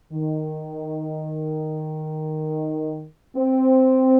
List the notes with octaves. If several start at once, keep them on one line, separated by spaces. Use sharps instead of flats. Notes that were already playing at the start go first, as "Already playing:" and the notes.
D#3
C4